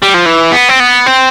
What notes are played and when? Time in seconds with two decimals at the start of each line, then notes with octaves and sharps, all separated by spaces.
0.02 G3
0.14 F3
0.26 E3
0.52 B3
0.69 C4
0.80 B3
1.06 C4